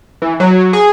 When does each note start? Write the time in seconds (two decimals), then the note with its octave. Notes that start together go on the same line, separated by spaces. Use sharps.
0.22 E3
0.40 F#3
0.73 G#4